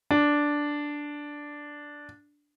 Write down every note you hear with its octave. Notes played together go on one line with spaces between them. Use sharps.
D4